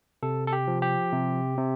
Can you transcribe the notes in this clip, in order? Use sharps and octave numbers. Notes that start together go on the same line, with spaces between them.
C3 A4
A4
G4
F3
G4
C3
C3